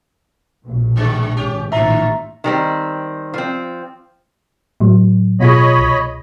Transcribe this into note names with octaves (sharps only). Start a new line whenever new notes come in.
A#1 B2
G2 D3 G#3
G#1 C#4 G4
A1 A#2 D3 F4 E5 A#5
D#3 G3 C4
F3 C4
A2 F#3
B2 F4 G#4 C#5 D#5 B5
C2